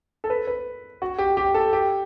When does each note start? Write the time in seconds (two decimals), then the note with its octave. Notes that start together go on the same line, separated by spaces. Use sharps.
0.24 A4
0.30 B4
0.47 B4
1.02 F#4
1.18 G4
1.37 G4
1.54 A4
1.73 G4